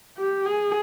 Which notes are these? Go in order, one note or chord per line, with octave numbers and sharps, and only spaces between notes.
G4
G#4